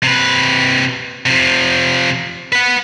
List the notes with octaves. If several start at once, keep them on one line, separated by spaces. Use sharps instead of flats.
C3 B4
C3 F3
B4 F#5